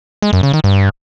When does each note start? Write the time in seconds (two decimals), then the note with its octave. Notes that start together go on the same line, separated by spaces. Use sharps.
0.22 G#3
0.33 F#2
0.43 C#3
0.53 D#3
0.64 G2